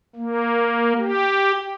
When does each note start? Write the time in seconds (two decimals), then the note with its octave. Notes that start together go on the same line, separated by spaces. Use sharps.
0.16 A#3
0.98 G4